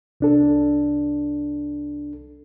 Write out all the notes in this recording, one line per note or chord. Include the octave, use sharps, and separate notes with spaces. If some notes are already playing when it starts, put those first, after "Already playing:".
C2 D4 A4